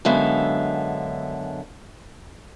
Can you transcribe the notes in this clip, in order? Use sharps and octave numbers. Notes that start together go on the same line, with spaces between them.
F#2 D3 G#3 B3 E5 F5